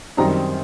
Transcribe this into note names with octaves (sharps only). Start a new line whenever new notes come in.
F#2 D#3 G3 C4 D#4 A#5